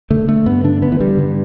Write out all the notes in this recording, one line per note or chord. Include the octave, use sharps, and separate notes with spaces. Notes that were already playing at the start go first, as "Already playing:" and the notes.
D3 A3
D3 A3
G2 B3
D3 D4
D3 B3
E3
G2 G3
D3